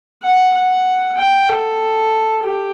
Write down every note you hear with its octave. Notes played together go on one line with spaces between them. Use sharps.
F#5
F#5
G5
A4
G4